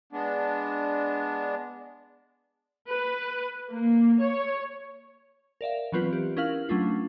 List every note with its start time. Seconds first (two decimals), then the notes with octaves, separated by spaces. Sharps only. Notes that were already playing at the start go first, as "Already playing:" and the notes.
0.13 G#3 B3 D4
2.89 B4
3.70 A#3
4.22 C#5
5.61 A#4 D5 E5 F5
5.92 E3 F#3 B3 C4 F4 B4
6.13 G4
6.37 C#4 E4 A#4 F5 F6 F#7
6.69 F#3 A3 C#4 D4 F4